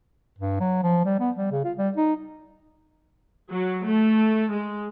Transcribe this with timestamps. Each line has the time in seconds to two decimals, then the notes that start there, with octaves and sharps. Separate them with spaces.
0.39 G2
0.60 F#3
0.83 F3
1.05 G3
1.20 B3
1.37 G3
1.52 C#3
1.65 F4
1.77 G3
1.97 D#4
3.49 F#3
3.85 A3
4.51 G#3